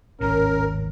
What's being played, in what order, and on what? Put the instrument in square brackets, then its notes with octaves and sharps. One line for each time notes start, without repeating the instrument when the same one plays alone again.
[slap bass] G#1 D#2 A2 [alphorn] C#4 [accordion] A#4